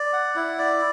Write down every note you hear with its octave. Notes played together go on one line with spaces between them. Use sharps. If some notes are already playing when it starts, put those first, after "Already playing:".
Already playing: D5
F#5
E4
D5